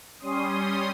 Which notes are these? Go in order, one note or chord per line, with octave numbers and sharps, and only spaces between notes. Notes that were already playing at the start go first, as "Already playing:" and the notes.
G3 C#4 C6 D#6